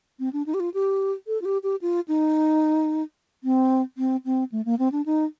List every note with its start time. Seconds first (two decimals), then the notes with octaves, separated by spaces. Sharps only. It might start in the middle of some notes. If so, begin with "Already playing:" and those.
0.19 C4
0.33 D4
0.46 D#4
0.54 G4
0.60 F4
0.74 G4
1.27 A4
1.42 F4
1.45 G4
1.63 G4
1.82 F4
2.08 D#4
3.44 C4
3.98 C4
4.25 C4
4.52 A3
4.65 A#3
4.79 C4
4.92 D4
5.06 D#4